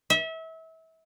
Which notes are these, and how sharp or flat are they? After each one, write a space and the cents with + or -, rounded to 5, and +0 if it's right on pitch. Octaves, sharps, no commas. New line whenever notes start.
E5 -30